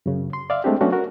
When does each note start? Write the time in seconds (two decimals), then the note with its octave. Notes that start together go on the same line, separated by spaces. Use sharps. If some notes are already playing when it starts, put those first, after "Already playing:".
0.06 F#2 C#3
0.33 C6
0.50 D5 E5 F5
0.64 G#3 A3 C4 D4 G4
0.81 F#3 A3 B3 C#4 D4 F#4
0.92 F#4 A#4